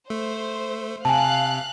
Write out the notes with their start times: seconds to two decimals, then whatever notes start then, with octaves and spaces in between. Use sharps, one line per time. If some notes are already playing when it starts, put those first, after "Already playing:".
0.10 A3 C5
1.05 C3 F5 G#5 A5 F#6